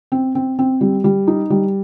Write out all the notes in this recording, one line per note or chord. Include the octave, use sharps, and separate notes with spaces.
C4
C4
C4
G3
G3
D#4
G3